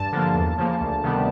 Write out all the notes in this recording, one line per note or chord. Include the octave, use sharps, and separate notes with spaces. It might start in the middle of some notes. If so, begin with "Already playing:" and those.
Already playing: G2 A5
D3 F3 A#3
E2
C#3 F3 A#3
D2
C3 D#3 G3 B3